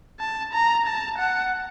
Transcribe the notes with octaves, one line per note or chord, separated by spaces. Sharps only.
A5
A#5
A5
F#5